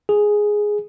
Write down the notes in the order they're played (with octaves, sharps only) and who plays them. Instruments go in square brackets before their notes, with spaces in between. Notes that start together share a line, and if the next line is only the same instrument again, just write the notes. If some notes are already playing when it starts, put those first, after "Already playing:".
[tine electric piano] G#4